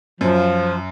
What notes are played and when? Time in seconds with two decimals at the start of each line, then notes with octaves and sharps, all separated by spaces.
0.21 F#2 F3